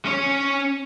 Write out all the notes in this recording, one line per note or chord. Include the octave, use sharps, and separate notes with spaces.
C#4 C#5